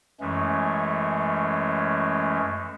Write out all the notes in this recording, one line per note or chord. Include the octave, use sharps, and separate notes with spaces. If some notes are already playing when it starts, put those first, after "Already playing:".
F#2 E3 G#3 A3 C#4